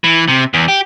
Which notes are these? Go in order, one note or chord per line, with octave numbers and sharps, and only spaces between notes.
E3
C3
E2
G4